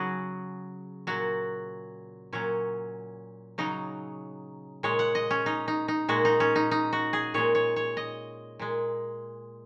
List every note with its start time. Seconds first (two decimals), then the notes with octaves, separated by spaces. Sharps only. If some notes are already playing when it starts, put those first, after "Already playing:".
Already playing: C#3 F#3 F#4 G#4
1.07 A#2 F#3 F#4
2.33 A#2 F#3 C#4
3.58 C#3 F#3 D#4
4.83 A#2 G#3 C#5
4.99 F#5
5.15 D#5
5.31 C#4
5.46 D#4
5.68 D#4
5.88 D#4
6.09 A#2 G#3 F#4
6.25 D#4
6.40 C#4
6.56 D#4
6.71 D#4
6.93 F#4
7.13 G#4
7.34 A#2 G#3 C#5
7.55 C#5
7.76 C#5
7.97 D#5
8.59 A#2 G#3